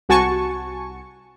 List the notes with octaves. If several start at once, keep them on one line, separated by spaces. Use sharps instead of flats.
C2 F#4 G#5 A5 C#6 C#7